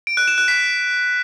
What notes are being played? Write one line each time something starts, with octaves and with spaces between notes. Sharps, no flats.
D7
F#6
E7
F#6
B6